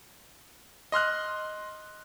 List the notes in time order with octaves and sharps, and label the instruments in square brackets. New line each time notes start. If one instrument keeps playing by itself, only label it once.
[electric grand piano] D#5 C6 F6 F#6